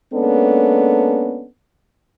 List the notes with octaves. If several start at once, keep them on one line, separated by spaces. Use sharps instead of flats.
G#3 A#3 B3 C#4 D4 A4